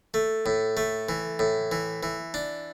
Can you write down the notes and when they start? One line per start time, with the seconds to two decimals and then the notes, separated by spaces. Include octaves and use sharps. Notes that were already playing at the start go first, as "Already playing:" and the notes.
0.14 A3
0.46 A2
0.77 A3
1.09 E3
1.39 A2
1.72 E3
2.03 E3
2.34 D4